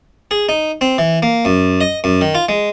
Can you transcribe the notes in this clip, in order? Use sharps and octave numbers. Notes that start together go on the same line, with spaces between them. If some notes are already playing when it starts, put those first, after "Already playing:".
G#4
D#4
C4
E3
A#3
F#2
D#5
F#2
D#3
F4
G#3